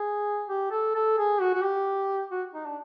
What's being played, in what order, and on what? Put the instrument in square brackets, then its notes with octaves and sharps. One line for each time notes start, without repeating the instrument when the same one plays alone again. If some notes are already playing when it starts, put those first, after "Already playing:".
Already playing: [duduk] G#4
G4
A4
A4
G#4
F#4
F#4
G4
F#4
D#4
D4